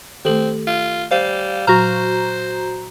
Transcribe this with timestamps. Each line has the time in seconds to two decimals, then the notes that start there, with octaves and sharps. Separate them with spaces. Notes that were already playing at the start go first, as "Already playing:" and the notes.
0.25 D#3 A3 C4 G4 A4 F#7
0.67 F4
1.11 G3 C5 F5
1.67 A#2 F#3 F#4 C5 A#5 F6